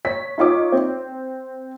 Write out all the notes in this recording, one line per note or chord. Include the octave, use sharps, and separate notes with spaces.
C#5 B6
D#4 F4 C#5 D6
C4